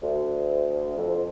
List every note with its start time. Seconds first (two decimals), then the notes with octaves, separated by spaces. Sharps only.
0.01 D2
0.96 F2